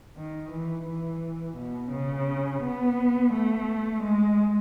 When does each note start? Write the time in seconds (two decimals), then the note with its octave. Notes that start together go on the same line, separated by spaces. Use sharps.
0.16 D#3
0.52 E3
0.86 E3
1.57 B2
1.92 C#3
2.63 B3
3.33 A3
4.03 G#3